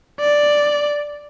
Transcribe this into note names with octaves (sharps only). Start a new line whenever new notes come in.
D5